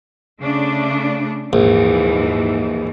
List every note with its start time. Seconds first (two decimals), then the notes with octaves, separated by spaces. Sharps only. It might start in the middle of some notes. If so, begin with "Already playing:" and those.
0.41 C#3 A3 D4
1.53 A#1 D#2 G#2 E3